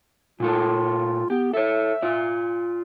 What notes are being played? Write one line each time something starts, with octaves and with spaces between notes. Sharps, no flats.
A#2 A3 F4 A4
B3 G4
A4 C#5 E5
F4 D5